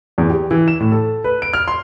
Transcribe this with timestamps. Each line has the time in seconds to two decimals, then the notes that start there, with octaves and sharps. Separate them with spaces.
0.18 E2
0.30 G4
0.51 E3
0.68 E7
0.80 A2
0.92 A4
1.24 B4
1.42 D7
1.53 F6
1.68 C6